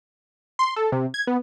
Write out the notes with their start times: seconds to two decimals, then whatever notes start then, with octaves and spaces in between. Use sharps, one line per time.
0.59 C6
0.76 A4
0.92 C3
1.14 G#6
1.27 B3